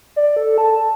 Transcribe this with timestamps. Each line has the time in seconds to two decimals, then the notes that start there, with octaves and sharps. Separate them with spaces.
0.16 D5
0.36 A4
0.58 A5